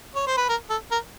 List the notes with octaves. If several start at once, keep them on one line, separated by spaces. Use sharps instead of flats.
C#5
C5
B4
A#4
A4
A#4